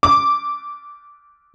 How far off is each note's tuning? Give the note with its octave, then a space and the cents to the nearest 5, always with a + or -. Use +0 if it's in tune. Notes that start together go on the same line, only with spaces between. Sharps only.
D6 -10